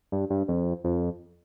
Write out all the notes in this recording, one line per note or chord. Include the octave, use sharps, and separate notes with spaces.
G2
G2
F2
F2